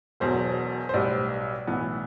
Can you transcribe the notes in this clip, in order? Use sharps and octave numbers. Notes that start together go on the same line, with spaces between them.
E1 E2 B2 F#3 C5
C5
B1 A2 G3 B3 D5
B1 A2 E3 B3